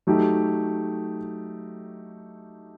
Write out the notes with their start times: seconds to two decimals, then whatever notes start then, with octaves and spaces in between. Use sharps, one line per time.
0.07 F#3 A3 D#4 G4